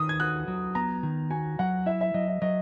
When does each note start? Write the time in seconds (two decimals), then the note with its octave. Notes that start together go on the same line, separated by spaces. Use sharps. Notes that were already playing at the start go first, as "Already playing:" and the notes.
Already playing: D#3 D#6
0.09 G#6
0.20 F#4 F#6
0.48 F#3
0.75 B3 A#5
1.03 D#3
1.31 F#4 G#5
1.59 F#3 F#5
1.86 E4 E5
2.01 E5
2.14 F#3 D#5
2.28 E5
2.42 F#3 D#5